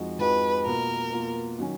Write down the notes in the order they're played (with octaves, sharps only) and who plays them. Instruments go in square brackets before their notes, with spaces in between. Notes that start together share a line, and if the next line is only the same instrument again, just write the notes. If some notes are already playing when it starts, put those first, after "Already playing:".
Already playing: [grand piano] F2 F3 G#3 D#4 F#4
[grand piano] F2 F3 G#3 D#4 F#4 [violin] B4
[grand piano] B2 A#3 F4 [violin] A#4
[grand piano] B2 A#3 F4
D#3 F#3 C#4